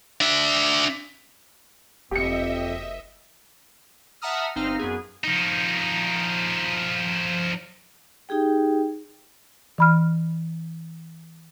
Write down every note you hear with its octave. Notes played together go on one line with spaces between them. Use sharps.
D4 E5
F#1 F2 G4 D#5 E5 C#7
E5 F#5 A5 A#5 D#6 F6
G1 C4 D#4 F5 F6
F#2 B3 G#4
F3 D#4
D#4 G4 G#4 G5
E3 B5 F6